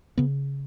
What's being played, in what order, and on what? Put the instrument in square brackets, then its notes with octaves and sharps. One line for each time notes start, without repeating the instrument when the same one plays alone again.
[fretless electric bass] C#3 B3